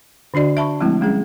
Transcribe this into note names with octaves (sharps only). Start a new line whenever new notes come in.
D3 D4 F#4 D5 D#5
E5 A5 B5 C#6
F3 G#3 A3 C4 E4
G3 G#3 C#4 G#4